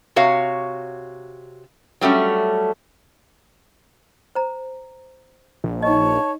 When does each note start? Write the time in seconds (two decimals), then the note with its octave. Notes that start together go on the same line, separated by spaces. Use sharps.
0.16 C3 F#4 C#5 F5
2.01 F#3 G3 A3 C#4
4.35 C5 A#5
5.64 A#1
5.83 D#4 C#5 D#5 A5 C#6